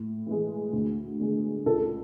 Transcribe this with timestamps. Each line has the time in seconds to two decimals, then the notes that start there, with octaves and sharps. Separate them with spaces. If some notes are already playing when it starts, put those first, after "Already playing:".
Already playing: A2
0.26 E3 G#3
0.73 D2
1.20 D3 G#3 B3
1.66 C#2 A4